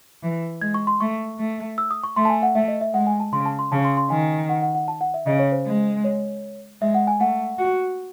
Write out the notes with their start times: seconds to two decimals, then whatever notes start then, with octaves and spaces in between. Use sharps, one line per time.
0.23 E3
0.61 G#3 G#6
0.74 C#6
0.87 C6
1.00 A3 C#6
1.39 A3
1.78 E6
1.91 D#6
2.04 C#6
2.16 A3 C6
2.25 A5
2.30 G#5
2.43 F#5
2.55 A3 E5
2.68 D#5
2.81 E5
2.94 G#3 F#5
3.07 G#5
3.20 A5
3.33 C#3 C6
3.46 A5
3.59 C6
3.72 C#3 A5
3.85 C6
3.97 C6
4.10 D#3 G#5
4.49 F#5
4.62 F#5
4.75 F#5
4.88 A5
5.01 F#5
5.14 E5
5.27 C#3 D#5
5.39 C#5
5.52 C5
5.66 G#3
6.04 C#5
6.81 G#3 E5
6.94 F#5
7.07 G#5
7.20 A3 F#5
7.59 F#4